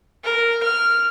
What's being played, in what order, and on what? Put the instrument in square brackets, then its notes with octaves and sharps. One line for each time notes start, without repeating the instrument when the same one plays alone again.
[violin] A#4
F6